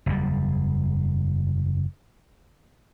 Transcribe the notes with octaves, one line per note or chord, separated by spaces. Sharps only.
F#1 E2 G3